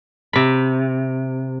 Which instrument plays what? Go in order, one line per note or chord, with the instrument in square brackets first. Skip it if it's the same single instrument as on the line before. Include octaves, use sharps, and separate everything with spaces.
[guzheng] C3 B5